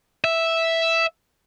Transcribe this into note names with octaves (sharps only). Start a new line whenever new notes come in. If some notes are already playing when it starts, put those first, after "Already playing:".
E5